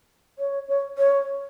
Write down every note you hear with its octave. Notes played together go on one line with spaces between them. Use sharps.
C#5
C#5
C#5